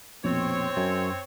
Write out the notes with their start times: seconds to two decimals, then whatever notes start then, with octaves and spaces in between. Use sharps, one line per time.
0.24 A#1 F2 B2 C4 C#5
0.77 F#2 G#6